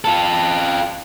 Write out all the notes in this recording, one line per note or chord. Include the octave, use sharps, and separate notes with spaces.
F4 A4